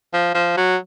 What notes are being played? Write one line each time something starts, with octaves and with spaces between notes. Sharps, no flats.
F3
F3
F#3